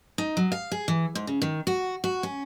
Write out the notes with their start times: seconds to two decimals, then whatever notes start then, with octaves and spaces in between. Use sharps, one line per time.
0.18 D#4
0.37 F#3
0.52 F5
0.71 G#4
0.88 E3
1.15 G#2
1.27 C#3
1.42 D#3
1.67 F#4
2.04 F#4
2.23 C#4